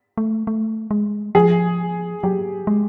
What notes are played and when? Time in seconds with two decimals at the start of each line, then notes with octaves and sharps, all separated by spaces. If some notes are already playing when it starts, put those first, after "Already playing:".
0.17 A3
0.47 A3
0.91 G#3
1.35 F3 G#4
2.23 F#3 G4
2.67 G#3